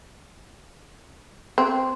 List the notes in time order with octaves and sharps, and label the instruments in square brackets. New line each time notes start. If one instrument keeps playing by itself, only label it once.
[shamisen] C4